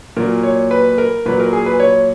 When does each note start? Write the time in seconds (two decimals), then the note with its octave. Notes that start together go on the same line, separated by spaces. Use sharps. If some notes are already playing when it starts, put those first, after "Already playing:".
0.17 A#2 F#3 A#4
0.43 C#5
0.71 B4
0.98 A#4
1.26 A#2 F#3 B4
1.40 A#4
1.53 G#4
1.66 B4
1.80 C#5